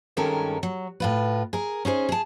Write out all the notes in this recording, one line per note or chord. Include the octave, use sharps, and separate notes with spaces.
G2 D#3 G#3 C#4 A4 A#4
F#3
A2 F4 B4
G#4 A#4
C#4 D#4 G#4 C5
G#4 A5